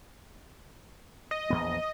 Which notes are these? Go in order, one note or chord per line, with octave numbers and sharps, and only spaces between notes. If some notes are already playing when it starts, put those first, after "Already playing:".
D#5
A#1 E2 B3